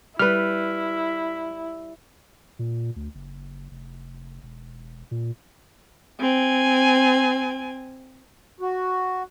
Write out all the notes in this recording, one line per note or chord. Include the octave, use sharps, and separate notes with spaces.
G3 E4 B4 F6
A#2
D2
F#1
F1
E1
A#2
C4 G#5
F#4